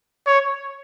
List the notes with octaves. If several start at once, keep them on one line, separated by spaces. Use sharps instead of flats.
C#5